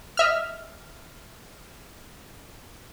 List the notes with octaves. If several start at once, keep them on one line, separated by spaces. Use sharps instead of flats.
D#5 E5 F6